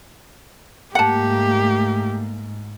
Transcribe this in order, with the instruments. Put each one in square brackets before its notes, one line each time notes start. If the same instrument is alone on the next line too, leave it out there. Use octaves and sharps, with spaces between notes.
[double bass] G#2 [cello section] A3 A#3 [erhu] G4 [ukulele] F#5 A5